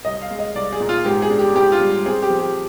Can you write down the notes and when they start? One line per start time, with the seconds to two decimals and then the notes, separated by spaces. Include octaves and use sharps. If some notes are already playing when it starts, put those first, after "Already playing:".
0.05 C2 D#5
0.22 F5
0.31 G#3
0.39 D#5
0.55 C2 D5
0.73 G#4
0.80 A#2
0.89 F4
1.05 G#2 G4
1.22 G#4
1.30 D4
1.39 G4
1.55 G#2 G4
1.72 F4
1.81 G3
2.06 C4 G#4
2.22 G4
2.30 F3
2.39 G4